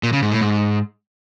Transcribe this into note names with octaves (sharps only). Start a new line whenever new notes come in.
A#2
C#3
G#2
A2
G#2